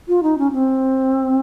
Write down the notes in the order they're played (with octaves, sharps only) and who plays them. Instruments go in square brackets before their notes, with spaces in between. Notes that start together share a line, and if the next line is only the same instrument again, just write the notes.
[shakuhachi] F4
D#4
C#4
C4